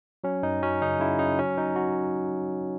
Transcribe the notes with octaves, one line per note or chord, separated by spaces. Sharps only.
F#3 C#4
F#2 D#4
F#3 C#4
C#3 D#4
C#3 E4
C#3 D#4
F#3 C#4
F#3 D#4
F#3 F#4